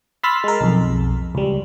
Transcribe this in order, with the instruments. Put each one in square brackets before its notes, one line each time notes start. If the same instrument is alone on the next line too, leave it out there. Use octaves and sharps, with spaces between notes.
[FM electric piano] B5 C6 E6 F6 A6 B6
G#3 A#4
B1 F2
C#2 G3